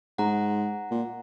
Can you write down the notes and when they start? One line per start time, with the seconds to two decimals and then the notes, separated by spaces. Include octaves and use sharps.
0.18 G#2 F#5 A#5
0.91 A#2